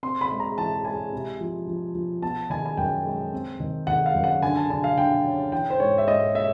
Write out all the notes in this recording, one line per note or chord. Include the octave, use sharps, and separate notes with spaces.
C4 C6
B5
G#3
A#5
E3 A5
G#3 G#5
C3
F3
F3
F3
B3 A5
D#3 G#5
G#5
F#2 G5
G#3
C4
D#3
D#3 F#5
F5
F#2
F#5
D3 G#5
A5
D3 G#5
F5
D3 G5
C#4
E3 G5
C5
G#2 C#5
E5
G#2 D#5
E5